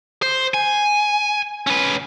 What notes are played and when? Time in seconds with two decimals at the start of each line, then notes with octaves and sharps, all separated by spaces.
0.22 C5
0.54 G#5
1.67 C#4 B4